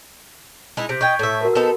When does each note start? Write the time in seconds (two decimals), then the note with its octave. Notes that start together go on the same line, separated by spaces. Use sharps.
0.77 G#3 D#4 E4
0.89 C3 G6 B6 D7
1.01 D#4 G5 C#6 G6 G#6
1.19 A2 E5
1.41 F#4 A#4 B4
1.55 B3 D#4 A4